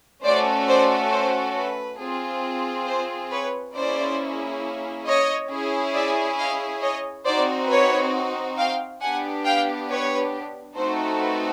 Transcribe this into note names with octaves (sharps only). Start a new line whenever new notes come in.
A3 C#4 F#4 A4 C5 D5
C5 D5
C5
B4
C4 F4 G#4
C5
B4 C#5
A#3 C#4 E4 G#4 C5 D5
C#5 D#5
C#4 E4 G#4
D5 E5
D#5 F5
C#5 D#5
C4 D#4 F#4 C5 D5
B4 C#5
F5 G5
B3 D4 G4 F#5 G#5
F5 G5
B4 C#5
A3 C4 D#4 F#4 A4 C5
B4